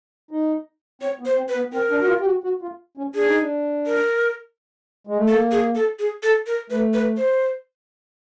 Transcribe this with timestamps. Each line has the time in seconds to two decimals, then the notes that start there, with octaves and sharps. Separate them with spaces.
0.31 D#4
1.01 C4 C#5
1.19 B3
1.26 C5
1.37 C4
1.49 B4
1.55 B3
1.72 C4 A#4
1.91 D4
2.01 F#4
2.08 F4
2.21 G4
2.26 F#4
2.44 F#4
2.62 F4
2.97 C#4
3.14 D4 G#4
3.27 D#4
3.39 D4
3.86 A#4
5.07 G#3
5.17 A3
5.28 A#3 A4
5.51 G#4
5.75 A4
5.99 G#4
6.23 A4
6.47 A#4
6.70 A3 B4
6.94 B4
7.17 C5